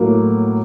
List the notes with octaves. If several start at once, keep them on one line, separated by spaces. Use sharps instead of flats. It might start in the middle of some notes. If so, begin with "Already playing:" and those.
Already playing: A2 F#3 A#3